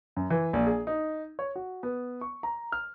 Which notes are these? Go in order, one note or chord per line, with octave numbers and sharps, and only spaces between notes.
F#2
E3
A#1
G#4
D#4
C#5
F#4
B3
C#6
A#5
F6